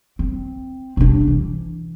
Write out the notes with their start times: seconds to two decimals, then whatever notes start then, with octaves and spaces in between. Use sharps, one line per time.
0.19 C4
0.97 C3 D4
1.28 E3